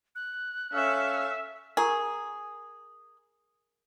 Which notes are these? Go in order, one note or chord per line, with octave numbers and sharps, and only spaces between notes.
F#6
C#4 A4 E5 F5
G#4 A#4 A#5 C#6